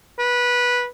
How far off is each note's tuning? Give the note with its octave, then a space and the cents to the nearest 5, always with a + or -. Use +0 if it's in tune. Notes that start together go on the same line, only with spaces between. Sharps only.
B4 -15